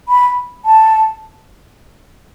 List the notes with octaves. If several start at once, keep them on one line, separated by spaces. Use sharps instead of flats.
B5
A5